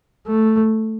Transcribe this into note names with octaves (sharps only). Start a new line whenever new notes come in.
A3